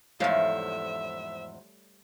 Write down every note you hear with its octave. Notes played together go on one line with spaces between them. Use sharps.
E2 G#2 F3 G3 A3 C#5 E5 F5